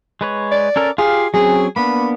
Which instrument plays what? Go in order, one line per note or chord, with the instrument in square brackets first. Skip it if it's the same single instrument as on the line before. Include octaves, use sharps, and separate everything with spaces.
[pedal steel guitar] G#3 B4 C#5
[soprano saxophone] D5
[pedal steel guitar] C#4 A4 A#4
[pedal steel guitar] F4 G4 F5 [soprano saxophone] G#4
[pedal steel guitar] F#3 C4 C#4 [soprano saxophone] G#4
[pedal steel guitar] A#3 B3 D4 [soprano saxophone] B5